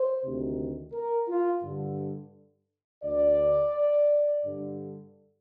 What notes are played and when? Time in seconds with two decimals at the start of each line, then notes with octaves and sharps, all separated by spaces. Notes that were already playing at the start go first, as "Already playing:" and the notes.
Already playing: C5
0.22 D2 C3 D#3
0.93 A#4
1.28 F4
1.62 G2 D3
3.04 D2 D3 D5
4.44 G2 D3